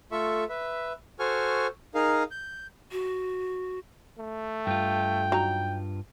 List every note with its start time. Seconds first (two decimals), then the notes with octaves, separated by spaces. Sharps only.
0.12 A3 F4 A4 E5 C#6
0.49 B4 E5
1.19 F#4 A4 C5 G#5 C#6 F6
1.94 D#4 G#4 A#4 F5
2.31 G6
2.92 F#4
4.18 A3
4.67 G2 F4 G5
5.32 F#3 D#4 A#5